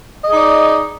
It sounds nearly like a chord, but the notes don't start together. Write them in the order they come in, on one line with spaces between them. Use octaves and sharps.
D#5 G#4 D#4 D5